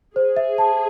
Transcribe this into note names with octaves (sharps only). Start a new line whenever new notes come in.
G#4 C5
E5
A5